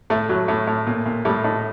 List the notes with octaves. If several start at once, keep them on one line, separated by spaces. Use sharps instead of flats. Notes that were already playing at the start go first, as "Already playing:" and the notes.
A2 A3
A2 F#3
A2
A2
A#2
A#2
A2 G3
A2 D#4